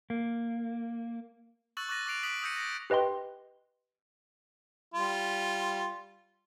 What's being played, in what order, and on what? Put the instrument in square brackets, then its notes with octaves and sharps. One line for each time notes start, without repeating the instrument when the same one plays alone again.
[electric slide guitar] A#3
[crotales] C#6 E6 F#6 A6 F#7
C#6 D6 F#6 A6 A#6 D#7
D6 F#6 C7 D7 F7
D#6 F#6 B6 D7 F#7
D#6 E6 G6 A#6 C#7 D#7
A#6
[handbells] G4 B4 D#5 G5 C6
[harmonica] G3 F4